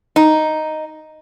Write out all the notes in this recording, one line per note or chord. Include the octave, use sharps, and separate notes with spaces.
D#4